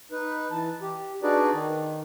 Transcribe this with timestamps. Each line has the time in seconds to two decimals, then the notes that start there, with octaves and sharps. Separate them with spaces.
0.12 D#4 B4
0.51 E3 A5
0.82 G4
1.23 D4 D#4 F#4 G#4 B4 D5
1.53 D#3